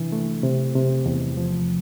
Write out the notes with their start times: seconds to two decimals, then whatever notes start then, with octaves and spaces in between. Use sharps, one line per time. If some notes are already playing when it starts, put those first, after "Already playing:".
Already playing: C3 E3 D4
0.12 A3
0.43 C3
0.75 C3
1.06 E2
1.37 F3